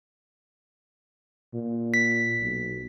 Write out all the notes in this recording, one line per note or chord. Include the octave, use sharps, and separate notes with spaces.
A#2
B6
B1